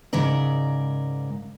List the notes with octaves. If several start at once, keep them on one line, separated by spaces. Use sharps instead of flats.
G#2 C#3 A#4 D5